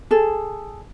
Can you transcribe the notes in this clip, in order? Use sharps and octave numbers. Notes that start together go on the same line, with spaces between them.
G#4 A4